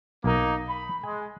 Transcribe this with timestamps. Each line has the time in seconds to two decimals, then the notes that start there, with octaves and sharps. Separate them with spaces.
0.24 B1 A#3 D#4 A#4
0.69 B5
1.04 G#3 G#5